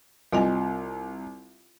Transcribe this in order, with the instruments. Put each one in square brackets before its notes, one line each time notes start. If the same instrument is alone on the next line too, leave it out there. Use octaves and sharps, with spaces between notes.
[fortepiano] C2 [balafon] F4 D#5 G#5